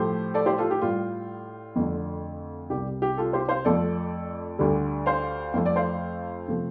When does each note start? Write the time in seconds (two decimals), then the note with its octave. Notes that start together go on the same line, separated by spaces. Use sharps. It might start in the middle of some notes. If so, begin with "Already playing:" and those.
Already playing: A2 F3 A3 G4 C5
0.34 A4 D5
0.46 G4 C5
0.58 F4 A4
0.71 G4
0.81 A2 G3 F4
1.76 F2 D3 A3
2.70 C2 C3 G3 G4
3.02 G4
3.17 F4 A4
3.33 G4 C5
3.49 C5 F5
3.65 F2 F3 A3 A4 D5
4.59 D2 D3 G3
5.06 C5 F5
5.53 F2 F3 A3 F5
5.66 D5
5.76 C5 F5
6.48 C3 F3 A3